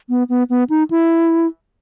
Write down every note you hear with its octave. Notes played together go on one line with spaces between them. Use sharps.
B3
B3
B3
D#4
E4